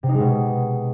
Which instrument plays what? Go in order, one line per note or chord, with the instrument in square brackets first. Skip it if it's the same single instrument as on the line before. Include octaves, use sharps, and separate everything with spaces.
[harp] C3
D#4
G#3
B2